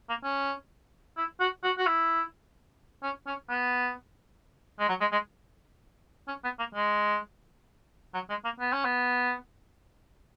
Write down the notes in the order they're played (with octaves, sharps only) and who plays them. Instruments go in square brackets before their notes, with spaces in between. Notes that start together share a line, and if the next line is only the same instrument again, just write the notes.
[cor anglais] A#3
C#4
E4
F#4
F#4
F#4
E4
C#4
C#4
B3
G#3
F#3
G#3
G#3
C#4
B3
A#3
G#3
F#3
G#3
A#3
B3
C#4
B3